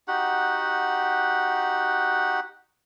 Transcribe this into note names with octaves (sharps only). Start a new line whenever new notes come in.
D#4 F#4 G4 F#5